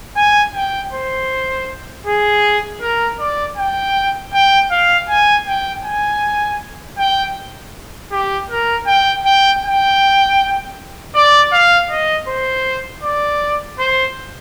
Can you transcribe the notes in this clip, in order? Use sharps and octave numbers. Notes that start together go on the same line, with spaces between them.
G#5
G5
C5
G#4
A#4
D5
G5
G5
F5
G#5
G5
G#5
G5
G4
A#4
G5
G5
G5
D5
F5
D#5
C5
D5
C5